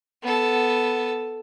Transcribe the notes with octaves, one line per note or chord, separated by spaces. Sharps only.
B3 A4